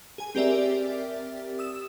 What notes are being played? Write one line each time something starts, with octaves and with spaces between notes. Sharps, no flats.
G#4 G#5
C4 G4 A#4 D5 E5
D#6 E6 E7